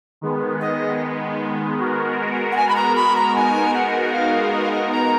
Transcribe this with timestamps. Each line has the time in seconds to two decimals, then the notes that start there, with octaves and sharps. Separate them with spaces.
0.21 D#3 G#3 B3
0.61 D#5
1.78 G#3 B3 F#4 A#4
2.52 F#5
2.57 G#5
2.69 B5
2.76 A#5
2.95 B5
3.16 A#5
3.34 G#3 B3 D#4 F#4 A#4 G#5
3.74 F#5
4.05 F#5
4.13 F5
4.53 D#5
4.62 F5
4.72 D#5
4.92 A#5